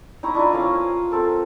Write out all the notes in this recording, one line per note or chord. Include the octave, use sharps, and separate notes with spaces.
D#4 E4 A#5 C#6
D4 E4 F4 D#5
C4 C#4 A#4 F5
C4
C4 A4 A#4